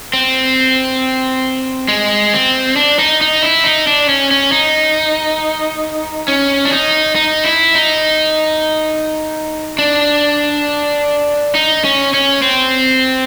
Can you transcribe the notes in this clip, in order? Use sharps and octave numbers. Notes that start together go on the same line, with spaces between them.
C4
G#3
C4
D4
D#4
D#4
E4
D#4
D4
C#4
C#4
D#4
C#4
D4
D#4
D#4
E4
D#4
D4
D#4
C#4
C#4
C4